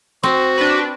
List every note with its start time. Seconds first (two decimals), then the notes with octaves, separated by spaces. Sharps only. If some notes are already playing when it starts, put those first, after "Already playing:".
0.23 C4 F#4 C5
0.57 D4 B4